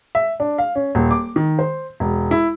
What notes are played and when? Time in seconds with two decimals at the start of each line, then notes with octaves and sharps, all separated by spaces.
0.15 E5
0.40 D4
0.58 F5
0.75 C#4
0.95 D#1
1.11 D6
1.36 D#3
1.59 C5
2.00 E1
2.31 E4